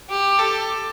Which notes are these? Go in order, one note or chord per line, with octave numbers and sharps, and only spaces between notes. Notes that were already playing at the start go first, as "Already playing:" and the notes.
G4
A4